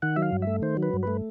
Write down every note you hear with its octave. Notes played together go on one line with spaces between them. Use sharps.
D#3 F#5
F#3 E5
F5
G2
A3 E5
D#3 C5
F#3
B4
G2
A3 B4